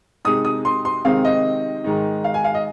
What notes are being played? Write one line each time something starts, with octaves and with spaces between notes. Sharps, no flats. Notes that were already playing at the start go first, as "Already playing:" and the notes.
C3 G#3 D#4 D#6
D#6
C6
C6
C3 D#3 G#3 C4 D#4 F5
D#5
G#2 D#3 G#3 D#4
F5
G#5
F5
D#5